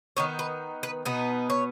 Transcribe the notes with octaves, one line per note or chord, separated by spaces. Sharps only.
D#3 B3 D#4 C#5
B4
B4
B2 B3 D#4
C#5